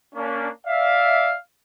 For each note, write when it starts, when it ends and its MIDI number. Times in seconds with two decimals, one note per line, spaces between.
0.15 0.49 58
0.15 0.49 61
0.15 0.49 62
0.66 1.35 74
0.66 1.35 76
0.66 1.35 77